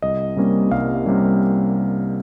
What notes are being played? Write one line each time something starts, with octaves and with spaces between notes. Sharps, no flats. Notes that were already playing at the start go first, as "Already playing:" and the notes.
C2 D#5
C3 G3 A#3 C#4
C2 F5
C3 G3 A#3 C#4